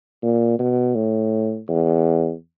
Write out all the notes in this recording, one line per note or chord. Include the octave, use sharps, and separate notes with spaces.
A#2
B2
A2
E2